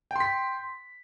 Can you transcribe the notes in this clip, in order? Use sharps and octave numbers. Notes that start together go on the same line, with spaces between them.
G5 C6 B6